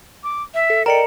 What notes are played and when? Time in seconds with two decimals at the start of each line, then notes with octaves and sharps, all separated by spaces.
0.24 D6
0.54 E5
0.70 A4
0.86 A#4 D5 D#5 G5 A#5 C#7